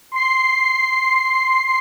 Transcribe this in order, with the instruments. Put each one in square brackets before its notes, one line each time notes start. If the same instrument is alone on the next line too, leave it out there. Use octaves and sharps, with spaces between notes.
[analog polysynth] C6 C7